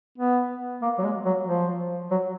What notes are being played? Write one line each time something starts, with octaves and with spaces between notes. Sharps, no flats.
B3
A#3
F#3
G#3
F#3
F3
F#3